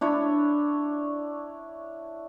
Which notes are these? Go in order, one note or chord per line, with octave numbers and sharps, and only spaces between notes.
D4 E4 C#5